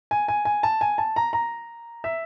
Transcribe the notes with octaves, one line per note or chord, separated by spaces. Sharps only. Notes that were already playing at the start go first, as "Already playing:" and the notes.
G#5
G#5
G#5
A5
G#5
A5
A#5
A#5
E5